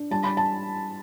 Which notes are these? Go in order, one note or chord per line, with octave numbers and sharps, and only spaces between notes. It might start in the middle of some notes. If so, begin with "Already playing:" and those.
Already playing: D4
G3 A5
B5
A5